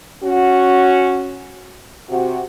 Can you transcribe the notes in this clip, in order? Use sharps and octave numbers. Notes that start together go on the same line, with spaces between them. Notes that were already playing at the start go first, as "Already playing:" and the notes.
C#4 F#4
C3 F#4